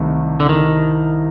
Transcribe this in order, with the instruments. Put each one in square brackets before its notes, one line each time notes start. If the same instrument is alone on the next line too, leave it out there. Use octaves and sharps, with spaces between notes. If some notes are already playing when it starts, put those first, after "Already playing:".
Already playing: [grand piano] C2 C3 A3 [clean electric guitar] D#3
[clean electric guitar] D3
D#3